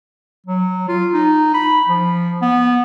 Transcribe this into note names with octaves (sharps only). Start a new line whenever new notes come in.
F#3
F4
D#4
B5
F3
B3